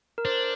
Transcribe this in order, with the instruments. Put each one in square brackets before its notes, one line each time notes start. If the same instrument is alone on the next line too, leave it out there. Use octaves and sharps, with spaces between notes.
[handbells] A#4
[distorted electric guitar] D4 [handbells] C5